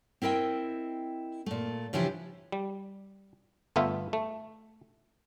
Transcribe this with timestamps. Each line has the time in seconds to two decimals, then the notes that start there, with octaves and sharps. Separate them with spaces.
0.22 C4 E4 A#4 D#5 G5
1.46 A#2 A3
1.93 C#3 E3 F3 D4 E4 G4
2.52 G3
3.76 G1 A3 B3 F4 E5
4.13 A3